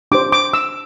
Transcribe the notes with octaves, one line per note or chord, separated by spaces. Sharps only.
D4 G4 C5 D6
D6
E6